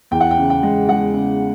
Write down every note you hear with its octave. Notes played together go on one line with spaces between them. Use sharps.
E2 G5
F#5
G5
C#3
G5
G#3
G#3 F#5
C#3